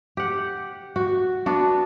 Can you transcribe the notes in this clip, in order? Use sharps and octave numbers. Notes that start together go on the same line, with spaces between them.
G4 F#5
F#4
B3 D4 F#4